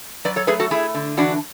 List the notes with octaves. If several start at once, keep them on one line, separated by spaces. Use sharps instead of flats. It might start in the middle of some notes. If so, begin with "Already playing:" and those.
F#3 B4 D5
A4 C#5
A3 G#4 B4
F#4 A4
A3 E4 G#4
D3
E3 D4 F#4